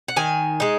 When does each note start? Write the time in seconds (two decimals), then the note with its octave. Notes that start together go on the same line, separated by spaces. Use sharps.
0.08 F#5
0.16 D#3 G#5
0.60 G#3 D#4